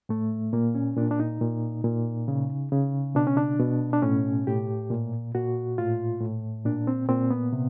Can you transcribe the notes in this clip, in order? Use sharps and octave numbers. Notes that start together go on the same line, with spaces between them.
A2 A3
A#2 A#3
C#4
A#2 D4
D4
D#4
A#2
A#2
C#3
C#3
B2 D4
C#4
D4
B2
D4
A2 C#4
A2 G4
A#2
A#2 F#4
A2 F4
A2
A#2 D4
C4
A#2 C4
B3
C3